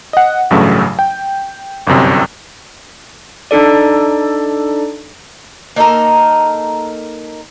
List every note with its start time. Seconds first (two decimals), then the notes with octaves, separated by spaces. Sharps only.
0.13 D#5 F#5
0.50 A1 G2 C#3 F#3 A3
0.99 G5
1.87 G1 C2 F#2 C3
3.51 D4 D#4 A4 D5
5.76 A#3 D#4 A4 A#4